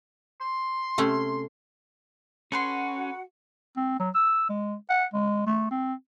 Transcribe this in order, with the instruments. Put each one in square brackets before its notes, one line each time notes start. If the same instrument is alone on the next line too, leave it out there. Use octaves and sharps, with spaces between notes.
[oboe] C6
[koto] C3 A3 C#4
[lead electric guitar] C#4 [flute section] F#4 F#5 [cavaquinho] A4 B4 C6
[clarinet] C4
F#3
E6
G#3
F#5
G#3
A3
C4